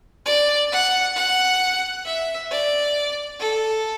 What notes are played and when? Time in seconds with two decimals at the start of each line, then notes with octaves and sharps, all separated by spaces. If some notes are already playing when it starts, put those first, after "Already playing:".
0.26 D5
0.72 F#5
1.16 F#5
2.05 E5
2.51 D5
3.39 A4